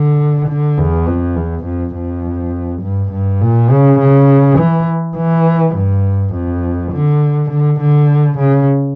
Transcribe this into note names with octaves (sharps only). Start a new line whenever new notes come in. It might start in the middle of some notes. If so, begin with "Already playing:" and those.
Already playing: D3
D3
E2
F2
E2
F2
F2
G2
G2
A#2
C#3
C#3
E3
E3
G2
F2
D3
D3
D3
C#3